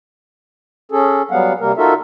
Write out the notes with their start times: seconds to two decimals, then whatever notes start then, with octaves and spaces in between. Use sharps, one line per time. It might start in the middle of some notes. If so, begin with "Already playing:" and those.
0.92 C#4 G#4 A4
1.31 F#3 G3 B3 F5 F#5
1.60 C3 G3 A#3 A#4
1.77 D#4 F4 F#4 A4 A#4 E5